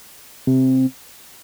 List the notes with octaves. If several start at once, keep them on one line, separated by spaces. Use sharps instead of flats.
C3